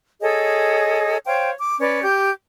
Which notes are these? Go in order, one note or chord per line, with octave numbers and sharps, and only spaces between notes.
G#4 A4 C#5 D#5
C5 C#5 F5 G5
D6
C#4 B4 D5
G4 G6